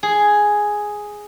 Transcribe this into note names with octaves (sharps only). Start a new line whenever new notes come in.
G#4